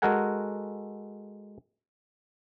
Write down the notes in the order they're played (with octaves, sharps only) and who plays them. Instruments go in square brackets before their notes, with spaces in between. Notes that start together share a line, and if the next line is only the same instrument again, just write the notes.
[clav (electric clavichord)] G#3 F#4 A4 A#4 F#5 G#5